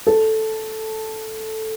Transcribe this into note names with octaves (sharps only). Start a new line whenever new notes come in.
A4